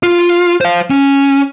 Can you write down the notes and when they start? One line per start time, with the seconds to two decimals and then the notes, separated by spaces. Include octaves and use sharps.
0.03 F4
0.61 C5 F5
0.91 C#4